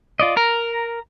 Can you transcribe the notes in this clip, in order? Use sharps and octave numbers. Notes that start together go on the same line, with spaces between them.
F4 D5 D#5
A#4 A#5